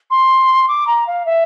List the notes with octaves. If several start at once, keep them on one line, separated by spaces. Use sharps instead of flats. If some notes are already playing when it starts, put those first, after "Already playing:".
C6
D6
A#5
F5
E5